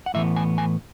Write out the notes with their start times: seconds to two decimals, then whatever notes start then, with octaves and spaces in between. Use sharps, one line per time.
0.06 F#5
0.14 A2 E3 B3 E5
0.36 G#5
0.58 G#5